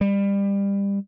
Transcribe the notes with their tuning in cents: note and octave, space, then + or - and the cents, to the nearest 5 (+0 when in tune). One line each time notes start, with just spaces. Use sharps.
G3 +25